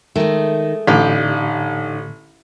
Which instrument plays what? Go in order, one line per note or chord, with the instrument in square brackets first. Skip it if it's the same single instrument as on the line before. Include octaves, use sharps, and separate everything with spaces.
[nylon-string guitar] D#3 [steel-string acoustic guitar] G#3 A3
[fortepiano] A1 [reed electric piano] A2 D3 [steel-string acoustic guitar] D#4 G4 D5 [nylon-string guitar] F5